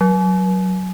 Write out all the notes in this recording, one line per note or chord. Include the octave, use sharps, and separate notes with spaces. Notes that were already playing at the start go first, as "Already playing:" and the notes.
F#3